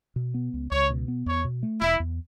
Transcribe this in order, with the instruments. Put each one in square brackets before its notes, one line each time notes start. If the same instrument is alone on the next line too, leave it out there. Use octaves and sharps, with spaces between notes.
[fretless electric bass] B2
B3
C#2
[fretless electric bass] C#2 [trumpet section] C#5
[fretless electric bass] B2
B3
[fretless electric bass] E2 [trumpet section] C#5
[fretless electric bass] B2
A3
[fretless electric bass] E1 [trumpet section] E4
[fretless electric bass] E2